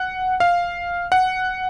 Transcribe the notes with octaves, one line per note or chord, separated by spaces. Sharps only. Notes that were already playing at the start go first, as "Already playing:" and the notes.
Already playing: F#5
F5
F#5